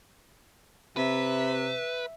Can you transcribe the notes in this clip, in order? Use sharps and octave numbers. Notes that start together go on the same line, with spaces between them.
C3 B4 E5